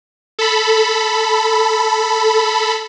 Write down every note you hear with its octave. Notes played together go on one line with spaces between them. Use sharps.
A4 B5